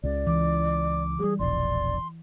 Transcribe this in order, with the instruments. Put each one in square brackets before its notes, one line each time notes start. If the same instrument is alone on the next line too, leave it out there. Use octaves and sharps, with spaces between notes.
[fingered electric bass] C#2 C#3 [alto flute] D5
[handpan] E3 [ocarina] D6
[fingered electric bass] F#3 G3 [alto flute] G#4
[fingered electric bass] E1 A#1 [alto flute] D5 [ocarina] C6